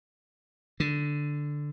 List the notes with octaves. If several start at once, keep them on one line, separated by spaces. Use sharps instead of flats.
D3